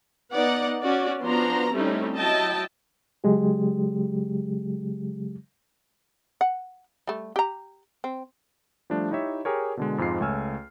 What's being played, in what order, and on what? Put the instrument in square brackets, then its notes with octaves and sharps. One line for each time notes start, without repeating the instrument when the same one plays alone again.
[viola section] B3 D#4 D5 F#5
C#4 F#4 D5
F3 B3 D4 F#4 A#5 C6
G3 A3 C4 C#4 D#4 E4
F#3 E4 D#5 G5 A5
[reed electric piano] C#3 F#3 G#3 G4
[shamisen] F#5
G3 A3
G4 A#5
C4
[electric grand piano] F3 G3 A3 D4
D#4 E4 G4 C#5 E5
G4 G#4 A#4 C#5
B2 D3 G#3
F2 G#2 G#3 F4 C7
C#2 A3 C#5 G#5 E6 F6